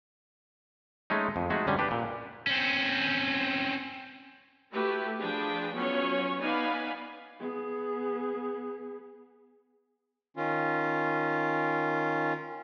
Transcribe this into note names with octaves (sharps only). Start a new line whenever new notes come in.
G#3 A3 C#4 D#4
F2
G#3 A3 D#4 F#4 G#4
F#2 D3 G3 C#4
D4 G4 B4
A#2
C4 C#4
A3 E4 F#4 G4 B4
F3 D4 G#4 B4 G5
F#3 B3 C#4 F4 C#5
B3 D#4 D5 F5 G#5 B5
B3 G#4
D#3 C#4 F4